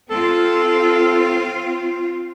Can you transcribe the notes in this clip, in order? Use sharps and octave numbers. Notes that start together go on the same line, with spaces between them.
C4 F4 A4